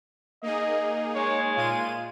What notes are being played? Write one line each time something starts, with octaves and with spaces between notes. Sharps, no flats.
A#3 D#4 G#4 D#5
G#3 C#5
A#2 F4 D#7